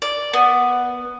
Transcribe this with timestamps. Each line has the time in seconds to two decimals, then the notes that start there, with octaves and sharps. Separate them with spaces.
0.02 D5
0.33 B3